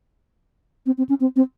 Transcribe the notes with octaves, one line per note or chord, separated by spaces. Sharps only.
C4
C4
C#4
C4
C4